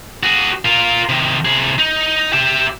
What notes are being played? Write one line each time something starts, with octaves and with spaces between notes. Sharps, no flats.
F#4 G#4
F4 A#4
C3 D#3
C3 G#4
D#4
G4 E5